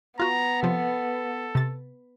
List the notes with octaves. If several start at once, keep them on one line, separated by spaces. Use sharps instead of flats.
B3 F4 F#4 A#5
C3 F3 A4
C3 A6